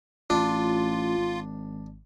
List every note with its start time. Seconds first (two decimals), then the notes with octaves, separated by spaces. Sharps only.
0.30 A1 D4 F4
1.18 G#1